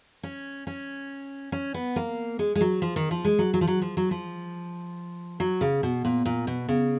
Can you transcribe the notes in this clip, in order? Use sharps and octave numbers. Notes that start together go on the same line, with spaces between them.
C#4
C#4
C#4
B3
A#3
G#3
G#3
F#3
F3
D#3
F3
G#3
F#3
F#3
F3
F#3
F3
F#3
F3
F#3
C#3
B2
A#2
A#2
B2
C#3